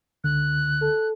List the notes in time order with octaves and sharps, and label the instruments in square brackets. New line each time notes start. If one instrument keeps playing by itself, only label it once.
[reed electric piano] C#2 D3 [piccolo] F#6
[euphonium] A4